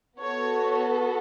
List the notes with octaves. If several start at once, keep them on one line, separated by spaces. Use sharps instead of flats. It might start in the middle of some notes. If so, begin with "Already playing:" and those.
B3 F#4 A4 C#5